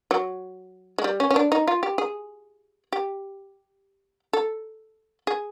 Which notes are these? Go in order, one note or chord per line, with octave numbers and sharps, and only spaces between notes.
F#3
G#3
G3
C#4
C#4
D4
D#4
F4
G4
G#4
G4
A4
G#4